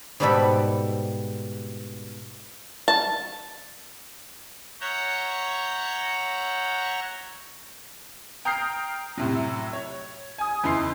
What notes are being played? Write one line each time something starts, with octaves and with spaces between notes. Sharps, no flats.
G#2 B2 G3 G4 A4 B5
A5
C#5 E5 F#5 A#5 C#6 G6
G5 A#5 D#6 F6 G6 C7
A2 C3 F#3
C#5
G#5 D#6
E2 C#3 D#4 E4 C6 C7